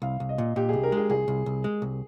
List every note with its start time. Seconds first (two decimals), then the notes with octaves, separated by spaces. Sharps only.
0.02 C2 F5
0.20 C2
0.29 D#5
0.38 A#2
0.56 A#2 G4
0.69 C2 G#4
0.83 A#4
0.92 G#3 G#4
1.10 C2 G#4
1.28 C2
1.46 C2
1.64 G#3
1.82 C2